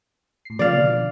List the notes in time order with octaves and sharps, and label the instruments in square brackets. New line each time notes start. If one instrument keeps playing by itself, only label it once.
[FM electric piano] A2 C7
[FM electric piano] C#3 F3 A#3 [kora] D5 F5
[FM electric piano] B2 D3